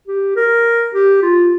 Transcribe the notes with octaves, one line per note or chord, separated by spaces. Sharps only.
G4
A#4
G4
F4